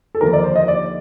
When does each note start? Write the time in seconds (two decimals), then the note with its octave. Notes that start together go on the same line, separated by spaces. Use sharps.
0.15 A4
0.21 D#2 D3 F3 A#4
0.33 D5
0.44 C5
0.56 D#5
0.68 D5